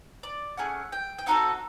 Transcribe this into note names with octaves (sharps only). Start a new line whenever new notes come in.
D5
A3 C#4 G#4 F#5
G5
G5
C4 D#4 F#4 A4 F#5